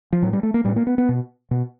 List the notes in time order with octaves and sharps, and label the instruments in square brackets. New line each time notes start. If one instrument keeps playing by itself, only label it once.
[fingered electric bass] F3
A2 F#3
G3
A3
A#3
A2 G3
A#3
B3
B3
B2
B2